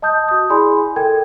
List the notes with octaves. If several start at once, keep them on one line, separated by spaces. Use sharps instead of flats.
D#5 A5 D#6 G6
F#4 D#6
E4 G#4 D5 G#5 B5 C6
A4 A#4 G5 G#6